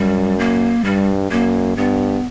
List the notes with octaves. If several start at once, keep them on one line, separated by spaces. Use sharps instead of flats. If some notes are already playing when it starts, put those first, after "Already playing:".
Already playing: F#2 G3
A#3
G2 G3
F#2 A#3
G2 B3